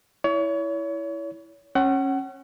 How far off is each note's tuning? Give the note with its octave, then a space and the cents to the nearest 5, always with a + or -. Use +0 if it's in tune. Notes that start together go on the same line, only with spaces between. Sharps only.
E4 +0 C#5 +35
C#4 -20 F#5 +30